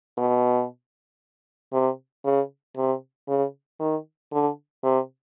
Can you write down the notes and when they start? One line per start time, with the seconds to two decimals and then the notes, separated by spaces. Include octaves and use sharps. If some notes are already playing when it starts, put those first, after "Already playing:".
0.18 B2
1.73 C3
2.25 C#3
2.77 C3
3.28 C#3
3.80 D#3
4.32 D3
4.83 C3